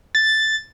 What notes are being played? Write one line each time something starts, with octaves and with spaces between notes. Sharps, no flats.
A6